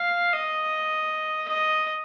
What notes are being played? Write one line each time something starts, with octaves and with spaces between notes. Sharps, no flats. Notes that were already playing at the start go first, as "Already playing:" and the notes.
Already playing: F5
D#5
D#5